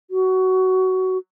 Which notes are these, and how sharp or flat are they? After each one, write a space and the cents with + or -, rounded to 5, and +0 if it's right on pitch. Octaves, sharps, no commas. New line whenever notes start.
F#4 +15